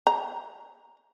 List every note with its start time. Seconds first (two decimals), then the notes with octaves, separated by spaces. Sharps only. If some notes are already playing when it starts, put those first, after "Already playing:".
0.07 A#5